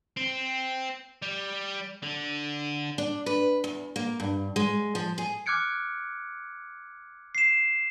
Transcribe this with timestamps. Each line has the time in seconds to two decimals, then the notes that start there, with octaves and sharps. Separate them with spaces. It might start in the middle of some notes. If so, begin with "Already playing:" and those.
0.17 C4
1.22 G3
2.03 D3
2.98 D4
3.26 B4
3.64 E2
3.96 A#3
4.20 G2
4.56 G#3
4.95 F3
5.18 G#4
5.46 D6 F6 F#6 G#6 C#7 D7
7.35 C7 E7